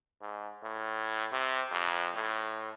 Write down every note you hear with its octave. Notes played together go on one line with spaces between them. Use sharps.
G#2
A2
C3
F2
A2